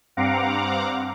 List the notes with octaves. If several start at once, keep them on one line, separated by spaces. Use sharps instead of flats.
G2 C4 F5 F#5 A#5 D6